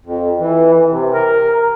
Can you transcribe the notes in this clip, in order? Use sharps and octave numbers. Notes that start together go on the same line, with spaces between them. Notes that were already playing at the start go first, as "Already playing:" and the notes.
F2
E3
C3
A#4